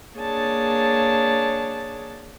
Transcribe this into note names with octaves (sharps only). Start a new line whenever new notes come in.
A#3 D4 G#4 C#5 A5